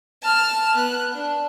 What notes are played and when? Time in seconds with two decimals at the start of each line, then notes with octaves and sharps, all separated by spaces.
0.22 A5 F6
0.75 B3 F#6
1.13 D4